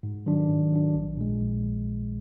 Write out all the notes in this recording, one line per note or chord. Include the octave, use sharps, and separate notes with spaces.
G#2
D#3 F#3 D4
G#2
D#3 F#3 D4
A#1
A#2 G#3
A#1